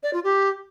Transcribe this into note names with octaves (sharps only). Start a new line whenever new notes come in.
D5
F4
G4